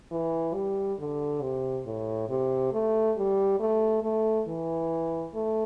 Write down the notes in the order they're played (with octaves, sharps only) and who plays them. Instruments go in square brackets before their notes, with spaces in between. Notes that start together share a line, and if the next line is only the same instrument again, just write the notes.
[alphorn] E3
G3
D3
C3
A2
C3
A3
G3
A3
A3
E3
A3